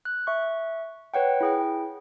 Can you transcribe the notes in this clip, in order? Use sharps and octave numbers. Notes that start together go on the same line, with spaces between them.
F#6
E5 C#6
B4 C#5 F#5 G5
E4 G#4 G5